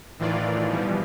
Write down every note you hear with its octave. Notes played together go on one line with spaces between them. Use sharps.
A2 D#3 E3 F4 D5
B2 E3 F3 G3